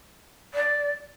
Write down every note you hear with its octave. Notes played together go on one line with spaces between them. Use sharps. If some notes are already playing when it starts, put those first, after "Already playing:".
D5